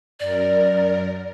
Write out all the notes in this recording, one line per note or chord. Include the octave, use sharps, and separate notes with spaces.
F#2 A#4 D5